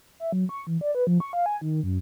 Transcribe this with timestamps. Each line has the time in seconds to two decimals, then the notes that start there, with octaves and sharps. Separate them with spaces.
0.20 E5
0.32 F#3
0.49 C#6
0.67 E3
0.81 D5
0.95 B4
1.07 F3
1.20 C#6
1.33 F5
1.46 G#5
1.61 D#3
1.83 F#2